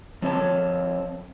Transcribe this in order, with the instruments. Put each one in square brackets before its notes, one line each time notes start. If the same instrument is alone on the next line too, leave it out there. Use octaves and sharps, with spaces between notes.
[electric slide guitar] F3 C4 C#5 A5